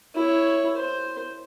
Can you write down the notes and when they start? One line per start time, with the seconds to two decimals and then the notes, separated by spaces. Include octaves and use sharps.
0.15 E4 C#5
0.76 C5